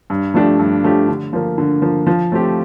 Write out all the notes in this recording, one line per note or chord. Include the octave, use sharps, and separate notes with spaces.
G2
F3 A3 D4 G4
G2
F3 A3 D4 G4
D3
F3 A#3
D3
F3 A#3
F3
A3 C4 G4